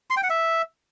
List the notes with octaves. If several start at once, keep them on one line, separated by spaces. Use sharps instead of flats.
C6
G5
F#5
E5